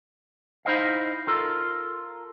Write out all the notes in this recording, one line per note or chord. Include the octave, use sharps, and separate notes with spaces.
D#4 E4 C5 D#5 F5
F4 A4 A#4